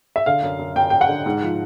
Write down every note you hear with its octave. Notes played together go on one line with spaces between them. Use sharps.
E5
D3 F5
F#2
F#2
F#2 G5
F#2 G5
F#5
D3
G#2
F3